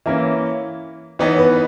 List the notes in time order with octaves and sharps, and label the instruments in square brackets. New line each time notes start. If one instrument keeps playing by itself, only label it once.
[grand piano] E3 A#3 C#4 [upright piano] E5
[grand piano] E3 B3 D#4 [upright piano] C#5
[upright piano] B4